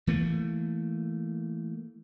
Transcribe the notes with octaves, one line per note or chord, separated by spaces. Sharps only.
E3 A3 A#3